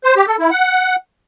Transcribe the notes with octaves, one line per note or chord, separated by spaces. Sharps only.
C5
G4
A4
E4
F#5